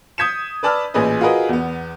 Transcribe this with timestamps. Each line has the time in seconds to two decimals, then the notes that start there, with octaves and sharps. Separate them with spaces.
0.18 D#6 G6 G#6 B6 C#7 E7
0.63 B4 D5 A5 B5 E6 F6
0.94 A1 A#2 G#4 B4 D#5
1.21 F4 F#4 G#4 A#4 B4 D#5
1.49 E2 B3